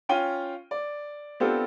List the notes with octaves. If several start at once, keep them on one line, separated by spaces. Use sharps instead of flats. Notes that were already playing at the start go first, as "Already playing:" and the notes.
C#4 F4 G5 D#7 G7
D5
B3 C4 D4 F4 G4 A4